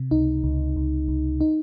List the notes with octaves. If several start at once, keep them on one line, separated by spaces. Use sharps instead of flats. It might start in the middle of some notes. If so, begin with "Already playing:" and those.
Already playing: C3
C#2 D#4
C#2
C#2
C#2
D#4